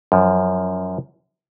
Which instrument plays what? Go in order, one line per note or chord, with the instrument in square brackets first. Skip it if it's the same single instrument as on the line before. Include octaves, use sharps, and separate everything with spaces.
[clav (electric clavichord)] F#2 F3